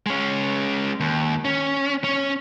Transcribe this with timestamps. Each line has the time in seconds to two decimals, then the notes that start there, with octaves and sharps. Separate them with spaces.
0.06 G#3 C#4
1.00 D#2
1.45 C#4
2.04 C#4